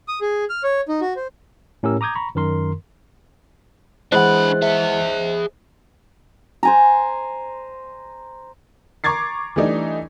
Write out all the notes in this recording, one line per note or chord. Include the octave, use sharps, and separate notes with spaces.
D#6
G#4
F6
C#5
D#4
F#4
C5
A2 C#4 G4 A#4 E6
A#5 D6 D#6 G6 G#6
A#5 B5 C#6
F#2 D#3 A#4 C6
D3 E3 G#3 C5 D#5 F#5 B5 F#6
G#4 E5
C5 G#5 A#5
A#5 C#6 D6 G#6 A6 C7
E3 G3 A3 D4 D#4